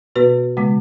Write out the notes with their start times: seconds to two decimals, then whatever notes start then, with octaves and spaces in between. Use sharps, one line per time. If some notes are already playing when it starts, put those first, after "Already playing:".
0.16 B2 B3 F#4 B4
0.57 C#3 G#3 B3